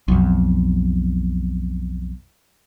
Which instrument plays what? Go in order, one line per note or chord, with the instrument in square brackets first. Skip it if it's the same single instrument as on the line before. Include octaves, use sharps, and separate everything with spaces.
[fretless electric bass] B1 F2